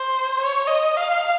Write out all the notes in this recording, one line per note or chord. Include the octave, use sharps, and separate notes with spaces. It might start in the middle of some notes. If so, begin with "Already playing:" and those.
Already playing: C5
C#5
D#5
F5